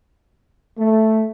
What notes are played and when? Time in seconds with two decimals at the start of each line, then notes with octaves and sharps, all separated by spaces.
0.78 A3